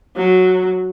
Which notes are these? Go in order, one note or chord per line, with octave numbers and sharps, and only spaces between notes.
F#3